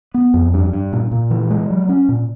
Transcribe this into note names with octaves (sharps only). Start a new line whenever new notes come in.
B3
F2
G2
G2
A#2
A#2
E3
G#3
F#3
C#4
A#2